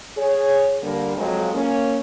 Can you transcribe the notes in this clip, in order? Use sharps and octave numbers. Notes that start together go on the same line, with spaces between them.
G#4 C#5
D3 G3 A#3
F2 F3 F#3 G#3
A#3 C#4